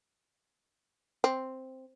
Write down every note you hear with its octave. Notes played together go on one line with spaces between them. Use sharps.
C4